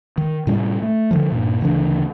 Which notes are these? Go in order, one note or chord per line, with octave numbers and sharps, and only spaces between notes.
D#3
A2 C3 G3 C#4
A3
D3 D#3 F3
G2 A#2
D2 C#3 E3 D4